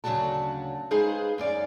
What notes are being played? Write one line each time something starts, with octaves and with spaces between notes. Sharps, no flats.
D2 C#3 F#3 D4 F#4 A5
G#3 D#4 G#4 B4 C5 F5
F#2 C#4 D5 F5